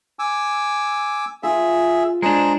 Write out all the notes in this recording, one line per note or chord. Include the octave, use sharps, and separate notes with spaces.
G#5 D6 E6
F4 G#4 E5
G#3 D4 G#4 C5 A#5